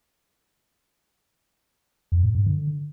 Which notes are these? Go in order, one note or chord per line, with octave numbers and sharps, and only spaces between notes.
F2
A2
G2
D3